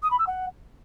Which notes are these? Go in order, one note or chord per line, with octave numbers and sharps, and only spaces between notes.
D#6
B5
E6
F#5